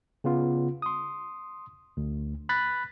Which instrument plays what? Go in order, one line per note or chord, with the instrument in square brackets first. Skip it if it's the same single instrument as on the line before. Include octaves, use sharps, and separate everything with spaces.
[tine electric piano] C#3 B3 F4
C6 D#6
D2
B5 F#6 A6 B6